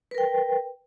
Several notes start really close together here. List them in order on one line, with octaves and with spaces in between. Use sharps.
B4 A#4 G5